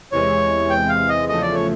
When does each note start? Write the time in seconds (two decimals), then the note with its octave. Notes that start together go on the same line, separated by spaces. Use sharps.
0.11 E2 C3 E3 G#3 C#5
0.70 G5
0.89 F5
1.09 D#5
1.28 E2 C#3 F3 A3 D#5
1.42 D5
1.54 C#5